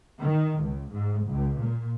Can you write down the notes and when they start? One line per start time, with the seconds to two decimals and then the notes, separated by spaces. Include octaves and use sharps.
0.20 D#3
0.62 C#2
0.92 G#2
1.28 C#2
1.61 A#2